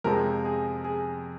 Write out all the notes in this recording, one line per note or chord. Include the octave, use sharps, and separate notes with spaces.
F2 C3 F3 G#3 A#4
G#4
G#4